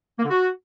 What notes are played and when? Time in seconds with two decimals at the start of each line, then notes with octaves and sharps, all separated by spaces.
0.19 A#3
0.24 D3
0.30 F#4